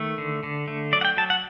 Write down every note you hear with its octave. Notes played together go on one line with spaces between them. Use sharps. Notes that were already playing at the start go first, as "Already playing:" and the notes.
Already playing: D#3 A3
D3
D3
A3
F#3 D5
F#5
G5
F#3 A5
F#5